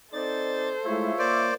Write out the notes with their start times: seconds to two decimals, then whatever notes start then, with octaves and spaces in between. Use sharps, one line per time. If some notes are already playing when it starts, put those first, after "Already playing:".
0.13 C4 D#4 A4 C5 D5 A6
0.84 G#3 A3 E4 F4 C#5 E5
1.19 A#3 C5 D5 D6